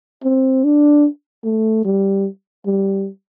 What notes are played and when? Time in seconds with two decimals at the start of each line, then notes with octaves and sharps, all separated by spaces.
0.24 C4
0.64 D4
1.44 A3
1.85 G3
2.66 G3